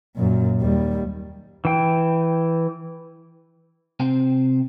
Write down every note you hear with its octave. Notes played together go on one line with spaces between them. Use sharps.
F#2 A#2
D#2 G3
E3 G5
C3 C4 C5 G5